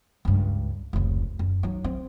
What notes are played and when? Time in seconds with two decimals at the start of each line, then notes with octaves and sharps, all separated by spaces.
0.25 C#2 G2
0.93 F1 C#2
1.39 F#2
1.63 F#3 D#4
1.84 C4